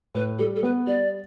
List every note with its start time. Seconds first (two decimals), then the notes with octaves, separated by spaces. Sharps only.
0.15 A2 B4
0.39 G3 A4
0.56 A4
0.63 B3 B4
0.87 G3 D5